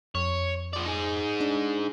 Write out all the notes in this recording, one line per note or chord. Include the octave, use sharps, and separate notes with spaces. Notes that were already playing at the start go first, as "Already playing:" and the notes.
F2 C#5
F3 D5
D#4 G#4
D4